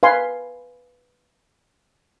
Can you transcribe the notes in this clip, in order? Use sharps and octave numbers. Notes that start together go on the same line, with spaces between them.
B4 F5 G#5 C6